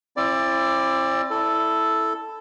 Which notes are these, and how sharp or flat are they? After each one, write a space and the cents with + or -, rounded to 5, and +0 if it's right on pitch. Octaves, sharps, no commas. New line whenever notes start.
C4 +40 E4 +20 D5 +5
E4 +0 A4 +0